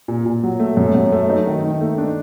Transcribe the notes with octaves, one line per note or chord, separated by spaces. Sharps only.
A#2
A#2
F#3
A3
F#2
F#2
A3
D#4
D#3
D#3
A3
D4